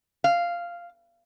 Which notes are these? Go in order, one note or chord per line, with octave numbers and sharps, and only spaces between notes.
F5